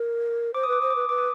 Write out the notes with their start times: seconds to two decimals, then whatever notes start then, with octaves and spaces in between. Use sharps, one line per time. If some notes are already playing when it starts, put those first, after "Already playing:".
Already playing: A#4
0.54 C5 D6
0.63 D#6
0.68 B4 D6
0.82 C5 D#6
0.90 D6
0.96 B4 D#6
1.09 B4 D6
1.18 D#6